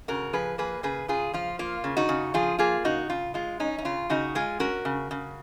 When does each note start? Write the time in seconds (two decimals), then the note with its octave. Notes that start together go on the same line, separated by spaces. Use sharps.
0.08 C#3 F#4 A#4
0.33 F3 G#4 B4
0.58 A#3 G#4 B4
0.83 C#3 G#4 B4
1.08 C#3 F4 G#4
1.34 F3 F4
1.59 A#3 F4
1.84 C#3
1.97 D#4 F#4
2.09 C#3
2.34 F3 F4 G#4
2.59 A#3 F4 G#4
2.84 C#3 D#4 F#4
3.10 C#3 F4
3.34 G#3 F4
3.60 C#4 D#4
3.78 D#4
3.85 C#3 F4
4.10 C#3 D#4 F#4
4.35 G#3 F4 G#4
4.60 C#4 F#4 A#4
4.85 C#3
5.11 C#3